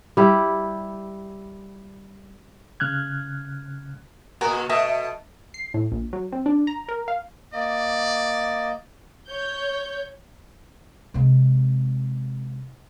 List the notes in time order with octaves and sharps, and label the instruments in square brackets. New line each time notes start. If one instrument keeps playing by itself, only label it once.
[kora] G3 E4 G4
[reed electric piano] C#3 F6 F#6 G#6
[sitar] A#2 F#4 [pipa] B3 G#4 A#4
[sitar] B2 A3 [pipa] D#5 E5 A5
[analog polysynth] C7
A2
A#1
F#3
C4
D4
A#5
A#4
F5
[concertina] A#3 D#5 [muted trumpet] D5
[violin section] C#5 G6
[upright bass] C3 G#3